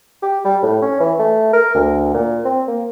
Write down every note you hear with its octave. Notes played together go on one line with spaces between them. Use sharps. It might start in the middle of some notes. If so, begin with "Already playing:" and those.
G4
G3
A2
C#4
E3
A3
A#4
D2
A#2
C4
A#3